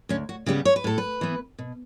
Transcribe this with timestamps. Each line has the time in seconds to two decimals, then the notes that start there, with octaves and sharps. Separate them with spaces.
0.09 D2 C#4
0.29 F#4
0.46 C#3 G3 B3 G4
0.65 C#5
0.76 B4
0.84 A2 A4
0.98 B4
1.21 E3 B3
1.59 B2